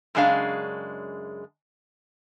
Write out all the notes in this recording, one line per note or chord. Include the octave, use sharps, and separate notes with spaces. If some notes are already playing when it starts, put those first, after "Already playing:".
F#2 C#3 G#3 D4 F5